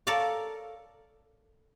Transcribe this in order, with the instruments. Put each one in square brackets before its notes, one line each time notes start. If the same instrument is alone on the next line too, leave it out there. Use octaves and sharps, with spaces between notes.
[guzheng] A4 A#4 C#5 D5 F5